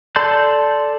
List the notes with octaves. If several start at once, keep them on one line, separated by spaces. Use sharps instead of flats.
A4 D5 A5 C6 G6